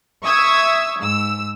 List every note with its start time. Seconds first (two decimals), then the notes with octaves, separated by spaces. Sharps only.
0.25 E5 C#6 D#6 E6 G#6
1.02 G#2 E6